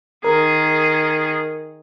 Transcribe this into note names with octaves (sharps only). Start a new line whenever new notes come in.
D#3 G#4 A#4